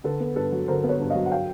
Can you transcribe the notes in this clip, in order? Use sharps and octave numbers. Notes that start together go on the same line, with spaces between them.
D3 A4 B4
B3
G2 A4 B4
F#3
D3 A#4 C5
B3
B4 C#5
G2
D#5 F5
F#3
F#5
F5 G5